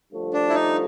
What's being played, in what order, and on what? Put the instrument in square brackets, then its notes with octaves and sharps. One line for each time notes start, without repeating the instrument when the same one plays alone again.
[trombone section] G2 D3 F3 A3
[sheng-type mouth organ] D4
E4
D#4